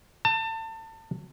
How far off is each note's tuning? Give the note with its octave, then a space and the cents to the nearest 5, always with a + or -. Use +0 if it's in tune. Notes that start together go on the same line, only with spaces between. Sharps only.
A5 +30